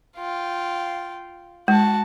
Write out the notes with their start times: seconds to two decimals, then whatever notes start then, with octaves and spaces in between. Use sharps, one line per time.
0.17 F4 G5
1.68 G#3 F#4 A5